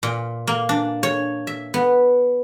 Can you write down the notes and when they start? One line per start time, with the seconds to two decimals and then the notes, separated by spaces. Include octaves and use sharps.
0.03 A#2
0.47 A#3
0.69 D4
1.03 C#5
1.47 E5
1.74 B3